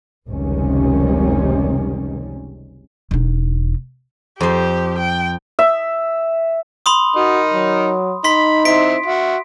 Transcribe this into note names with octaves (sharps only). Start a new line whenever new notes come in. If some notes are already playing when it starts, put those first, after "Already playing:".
F1 C#2 C3 D#3 G3 C#4
E1 D#4
F2 G4 C5
G5
E5
B5 C6 D#6
D#4 F#4 A#4
F#3
D#4 B5 C6 B6
C4 E4 B6 D7
F#4 E5